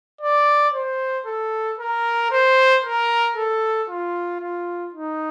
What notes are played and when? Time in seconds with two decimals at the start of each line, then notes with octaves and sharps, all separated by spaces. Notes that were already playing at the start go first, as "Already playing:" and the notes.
0.21 D5
0.74 C5
1.26 A4
1.79 A#4
2.31 C5
2.84 A#4
3.36 A4
3.89 F4
4.41 F4
4.94 D#4